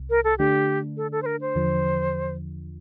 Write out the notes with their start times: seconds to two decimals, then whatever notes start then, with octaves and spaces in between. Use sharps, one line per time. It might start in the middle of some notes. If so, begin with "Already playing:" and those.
Already playing: C2 C3
0.10 A#4
0.24 A4
0.38 D3 A3 D4 G4
0.97 A4
1.12 A4
1.22 C5
1.26 A#4
1.41 C5
1.55 E2 D3 F3